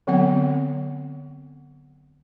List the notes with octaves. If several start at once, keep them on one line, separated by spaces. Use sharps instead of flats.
D3 F#3 B3 C4 F#5